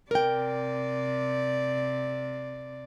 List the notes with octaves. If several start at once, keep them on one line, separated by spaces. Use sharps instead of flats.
C3 A#4 D5 G5